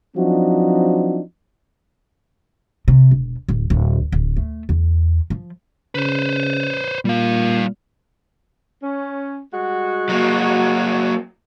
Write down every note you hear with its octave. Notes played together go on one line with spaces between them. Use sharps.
F3 F#3 C4 D4 D#4 F#4
C3
E1
D1
D1
D1
A3
E2
F3
C#3 B4 C5
A#2 G3 F5
C#4
G3 G#3 F#4
F#3 A#3